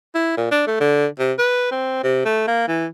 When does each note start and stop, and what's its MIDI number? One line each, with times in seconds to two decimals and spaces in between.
0.15 0.37 64
0.37 0.48 46
0.52 0.63 62
0.67 0.79 57
0.80 1.06 50
1.19 1.33 48
1.39 1.70 71
1.71 2.01 60
2.04 2.25 48
2.25 2.46 57
2.48 2.66 58
2.68 2.86 52